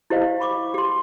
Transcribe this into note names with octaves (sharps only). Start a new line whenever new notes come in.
E4 G4 C5 D#5 F5
B5 C#6 D6
G4 C6